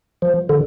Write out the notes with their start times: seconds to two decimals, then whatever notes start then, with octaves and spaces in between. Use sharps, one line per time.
0.22 F3
0.49 D3